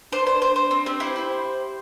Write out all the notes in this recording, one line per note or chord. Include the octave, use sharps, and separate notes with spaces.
D4 C5
C5
C5
C5
C4
C4 G4
E4 C5
E4